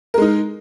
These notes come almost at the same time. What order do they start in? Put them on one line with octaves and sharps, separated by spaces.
A#4 G#3 D#4